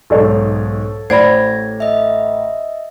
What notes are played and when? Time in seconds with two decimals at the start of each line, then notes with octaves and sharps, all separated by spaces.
0.10 B1 G#2 A4 C#5
1.10 A1 C5 D5 B5 G#6 A#6
1.80 D#5 E5